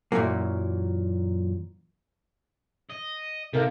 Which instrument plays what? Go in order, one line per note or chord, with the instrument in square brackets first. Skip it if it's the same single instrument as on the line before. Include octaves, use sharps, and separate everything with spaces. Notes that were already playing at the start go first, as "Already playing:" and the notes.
[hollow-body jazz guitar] F#2 A#2 C#3 E3 F#3 A#3
[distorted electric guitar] D#5
[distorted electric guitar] C3 [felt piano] A4 A#4 F5